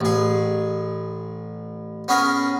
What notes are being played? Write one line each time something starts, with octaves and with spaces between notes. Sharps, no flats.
A1 G#4
B3 C#4 G#4 A#4